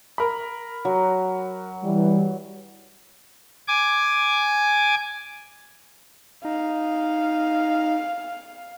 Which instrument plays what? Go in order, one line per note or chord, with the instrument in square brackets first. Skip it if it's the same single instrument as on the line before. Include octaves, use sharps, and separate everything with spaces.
[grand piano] A#4 B5
[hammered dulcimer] F#3
[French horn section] E3 G3
[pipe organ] G#5 D6
[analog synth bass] D#4 [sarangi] F5